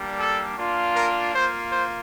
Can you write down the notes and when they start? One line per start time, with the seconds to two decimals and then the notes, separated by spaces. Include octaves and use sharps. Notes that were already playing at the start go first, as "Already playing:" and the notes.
Already playing: G3 A#3 D4
0.19 A4
0.57 A#3 D4 F4
0.96 A#4
1.34 A#3 F4 C5
1.72 C5